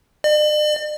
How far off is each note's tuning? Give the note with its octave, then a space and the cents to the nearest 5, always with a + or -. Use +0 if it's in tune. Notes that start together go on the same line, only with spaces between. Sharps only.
D5 +45